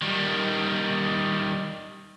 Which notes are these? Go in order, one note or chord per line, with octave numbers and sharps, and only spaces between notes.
D#3 G3